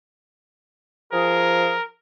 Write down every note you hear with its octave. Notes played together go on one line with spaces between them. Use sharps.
F3 G#4 A#4